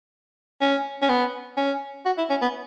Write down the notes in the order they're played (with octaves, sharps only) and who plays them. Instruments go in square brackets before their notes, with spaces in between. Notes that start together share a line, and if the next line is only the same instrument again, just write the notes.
[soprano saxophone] C#4
C#4
B3
C#4
F#4
E4
C#4
B3